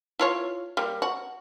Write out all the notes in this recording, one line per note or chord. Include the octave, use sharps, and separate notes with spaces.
E4 F4 C#5
G3 A#3
F#4